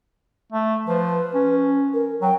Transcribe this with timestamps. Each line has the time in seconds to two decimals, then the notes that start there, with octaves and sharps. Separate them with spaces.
0.52 A3
0.87 F3 B4
1.35 C#4
1.93 A#4
2.22 F#3 G5